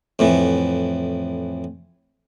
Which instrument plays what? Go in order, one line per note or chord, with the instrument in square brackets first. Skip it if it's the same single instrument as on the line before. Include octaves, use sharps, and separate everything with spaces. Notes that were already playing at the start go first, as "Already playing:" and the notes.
[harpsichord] F2 A2 E3